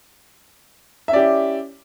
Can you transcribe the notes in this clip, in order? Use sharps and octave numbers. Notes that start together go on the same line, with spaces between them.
C#4 E4 G4 D5 E5